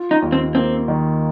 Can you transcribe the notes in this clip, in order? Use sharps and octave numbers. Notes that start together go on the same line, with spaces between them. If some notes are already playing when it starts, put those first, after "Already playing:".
Already playing: F4
D#4
D#2
C4
A#3 C4
D#3